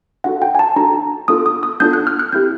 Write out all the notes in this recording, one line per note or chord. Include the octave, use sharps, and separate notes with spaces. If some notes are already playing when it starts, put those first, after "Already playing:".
D4 F#4 A4 F#5
G5
G#5
A5
D4 F#4 A4 A#5
B3 D4 F4 A4 D#6
D#6
D#6
B3 D4 F4 A4 G6
F#6
F6
F#6
C4 E4 G4 G6